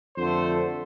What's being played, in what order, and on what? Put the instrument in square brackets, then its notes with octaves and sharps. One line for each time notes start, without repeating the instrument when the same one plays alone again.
[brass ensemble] F2 D3 A3 C5